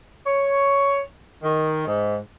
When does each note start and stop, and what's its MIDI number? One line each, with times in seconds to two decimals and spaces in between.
0.25 1.00 73
1.43 1.83 51
1.86 2.16 44